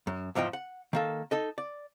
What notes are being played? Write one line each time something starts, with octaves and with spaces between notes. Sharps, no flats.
F#2
E2 G#2 F3 D#5 G5
F#5
D#3 A#3 A4
D#4 A4 D#5
D5